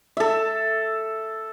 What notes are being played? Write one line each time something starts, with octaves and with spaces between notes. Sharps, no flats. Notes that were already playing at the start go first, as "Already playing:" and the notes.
A4 E5